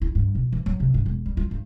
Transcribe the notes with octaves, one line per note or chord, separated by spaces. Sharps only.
E4
G2
B2
E3
F#3
C3
G2
E1
G3
F4
G2